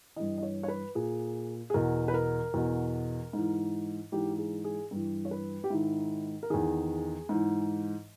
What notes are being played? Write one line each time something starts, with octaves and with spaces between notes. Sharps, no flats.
G2 E3 D#5
D#5
C#5
C#5
B4
A#2 G#4
G#4
E2 B2 A#4
B4
A#4
E2 B2
G#2 E3
G#2 E3 G4
G#4
G#4
G2 E3
C#5
B4
G4
G#2 D#3 E4
A#4
E2 D#3 G#4
G#2 E3